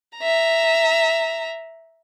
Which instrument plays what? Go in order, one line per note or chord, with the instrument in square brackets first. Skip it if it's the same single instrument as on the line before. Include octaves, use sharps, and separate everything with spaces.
[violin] E5 A#5